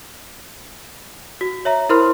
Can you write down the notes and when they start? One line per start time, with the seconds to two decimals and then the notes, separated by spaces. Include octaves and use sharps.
1.41 F#4
1.65 C#5 E5 A#5
1.89 E4 A#4 C5 B5 C6 F6